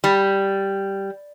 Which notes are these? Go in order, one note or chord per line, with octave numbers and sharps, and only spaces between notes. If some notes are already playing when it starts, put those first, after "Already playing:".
G3